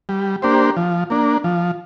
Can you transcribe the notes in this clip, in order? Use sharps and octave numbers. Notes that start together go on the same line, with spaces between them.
G3
A#3 D4 G4 C5
F3
A#3 D4
F3